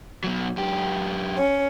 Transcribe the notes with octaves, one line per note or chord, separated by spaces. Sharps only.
B2 F#3
F#2 G4
C#4